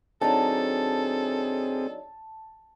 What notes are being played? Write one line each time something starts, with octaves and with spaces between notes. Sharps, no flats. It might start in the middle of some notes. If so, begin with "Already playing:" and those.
F#3 C4 D4 D#4 G#4 A4 A5